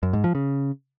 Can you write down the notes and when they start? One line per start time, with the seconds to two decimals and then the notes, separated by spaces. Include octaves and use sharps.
0.03 F#2
0.13 G#2
0.24 F3
0.35 C#3